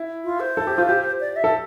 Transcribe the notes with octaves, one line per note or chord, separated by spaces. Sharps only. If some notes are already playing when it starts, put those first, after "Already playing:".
Already playing: E4
F4
C5
A4
G4
F4
G4
D5
E5
A4